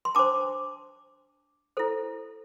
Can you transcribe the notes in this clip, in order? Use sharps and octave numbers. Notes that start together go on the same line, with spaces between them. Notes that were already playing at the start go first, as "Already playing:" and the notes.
C6
D4 C5 A5 D6
E4 A4 C5